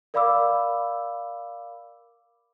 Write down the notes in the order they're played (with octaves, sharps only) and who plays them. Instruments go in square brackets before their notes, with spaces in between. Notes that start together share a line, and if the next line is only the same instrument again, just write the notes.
[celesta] A#4 D5 F5 B5 D6 E6